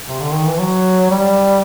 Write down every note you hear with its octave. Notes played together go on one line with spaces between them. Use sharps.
C3
D3
D#3
E3
F#3
G3